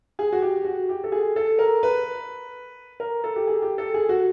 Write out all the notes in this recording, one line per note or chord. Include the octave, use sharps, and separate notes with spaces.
G#4
F#4
G4
F#4
G4
A4
G#4
A4
A#4
B4
A#4
A4
G4
G#4
G4
A4
G#4
F#4